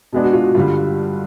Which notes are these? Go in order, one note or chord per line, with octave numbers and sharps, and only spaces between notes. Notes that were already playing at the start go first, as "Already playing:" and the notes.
B2 G#3 B3 D4
F#4
F4
F#4
G2 D3 G3 F4